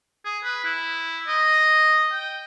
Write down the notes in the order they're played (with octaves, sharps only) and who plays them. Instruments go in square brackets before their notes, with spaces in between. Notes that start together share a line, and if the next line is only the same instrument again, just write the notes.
[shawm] G#4
B4
E4
D#5
G5